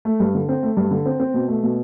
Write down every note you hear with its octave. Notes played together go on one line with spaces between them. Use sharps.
A3
G2
D3
C4
A3
G2
D3
C4
C4
B2
A3
B2